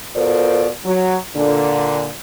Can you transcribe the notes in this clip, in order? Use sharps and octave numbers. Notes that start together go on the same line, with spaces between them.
B2 F4 A4 A#4 C5 D5
F#3
A#2 D3